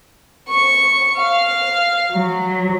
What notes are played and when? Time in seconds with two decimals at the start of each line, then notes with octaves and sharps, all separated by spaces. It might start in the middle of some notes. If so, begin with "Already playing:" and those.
0.49 C#6
1.16 F5
2.12 F#3